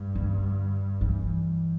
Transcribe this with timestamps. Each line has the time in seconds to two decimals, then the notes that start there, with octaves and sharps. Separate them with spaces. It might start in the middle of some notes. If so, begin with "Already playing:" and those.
Already playing: G2
0.15 D3
1.01 E3